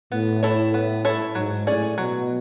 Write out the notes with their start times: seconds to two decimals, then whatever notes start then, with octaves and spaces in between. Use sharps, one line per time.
0.11 A2 B3
0.43 E4 A4 C#5
0.74 B3
1.05 E4 A4 C#5
1.35 G#2 F#3
1.67 A2 C#4 G#4 D5
1.98 B2 F#3